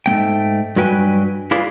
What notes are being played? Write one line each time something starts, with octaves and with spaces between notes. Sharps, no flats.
G#2 A3 A#3 G5
G2 F#3 F#4 B4 G5 G#5
E4 F4 G#4 B4 D5 F5